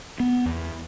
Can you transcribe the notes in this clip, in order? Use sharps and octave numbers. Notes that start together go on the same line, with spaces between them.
B3
E2